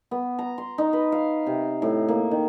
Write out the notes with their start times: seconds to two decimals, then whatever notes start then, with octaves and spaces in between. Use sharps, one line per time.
0.11 B3
0.39 A#5
0.58 C6
0.78 D#4
0.93 B4
1.12 F5
1.46 C3
1.82 A2
2.08 A#3
2.31 D#3